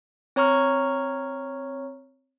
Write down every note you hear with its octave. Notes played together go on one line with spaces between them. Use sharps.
C4 C#5 A#5 C#6 F6